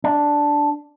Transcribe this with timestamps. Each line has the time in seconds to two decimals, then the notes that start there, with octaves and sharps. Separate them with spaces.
0.04 D4